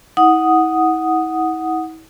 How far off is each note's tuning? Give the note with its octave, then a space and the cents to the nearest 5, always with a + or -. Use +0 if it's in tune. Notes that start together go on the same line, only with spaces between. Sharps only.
E4 -45 F#5 +0 D#6 +0